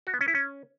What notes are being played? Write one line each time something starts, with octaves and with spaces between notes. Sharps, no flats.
F#4
B3
C#4
E4
C#4